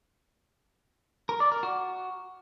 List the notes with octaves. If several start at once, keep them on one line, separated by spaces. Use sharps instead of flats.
A#4
D5
A#4
F#4